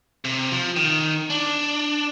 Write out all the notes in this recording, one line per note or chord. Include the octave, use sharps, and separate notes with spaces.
C3
F3
D#3
D4